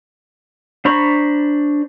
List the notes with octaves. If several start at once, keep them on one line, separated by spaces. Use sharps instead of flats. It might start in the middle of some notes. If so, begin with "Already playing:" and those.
D4 C5 A#5 B5 C#6